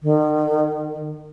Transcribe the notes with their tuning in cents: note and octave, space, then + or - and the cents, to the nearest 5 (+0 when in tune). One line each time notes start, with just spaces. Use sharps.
D#3 -40